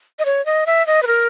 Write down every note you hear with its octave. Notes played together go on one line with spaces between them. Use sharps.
D#5
C#5
D#5
E5
D#5
B4
A#4